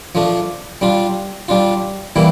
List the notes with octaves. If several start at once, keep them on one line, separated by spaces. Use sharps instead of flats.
F3 A3 D4
G3 D4 F4
G3 D4 F4
E3 G3 A#3 E4